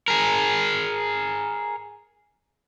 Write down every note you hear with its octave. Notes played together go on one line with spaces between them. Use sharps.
G#4 A#4